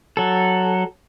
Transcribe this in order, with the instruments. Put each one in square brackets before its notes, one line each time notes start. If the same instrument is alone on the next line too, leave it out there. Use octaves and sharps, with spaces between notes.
[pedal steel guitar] F#3 A4